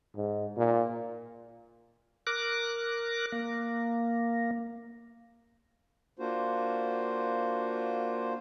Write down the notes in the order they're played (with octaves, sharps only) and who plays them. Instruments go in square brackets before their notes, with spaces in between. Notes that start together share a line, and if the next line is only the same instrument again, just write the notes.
[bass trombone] G#2
A#2
[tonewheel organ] A#4 D6 F#6
A#3
[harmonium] A#3 D4 F4 F#4 C5